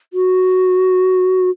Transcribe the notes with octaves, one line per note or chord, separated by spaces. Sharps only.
F#4